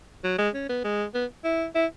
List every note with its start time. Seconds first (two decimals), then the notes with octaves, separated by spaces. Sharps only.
0.24 F#3
0.38 G#3
0.54 C#4
0.69 B3
0.84 G#3
1.14 B3
1.44 E4
1.75 E4